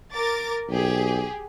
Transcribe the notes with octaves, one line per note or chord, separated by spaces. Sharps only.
A#4 D6 A6
B1 G4 G#4